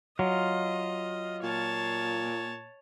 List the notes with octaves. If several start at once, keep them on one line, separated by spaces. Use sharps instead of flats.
F#3 F4 D#5
A#2 C#5 A5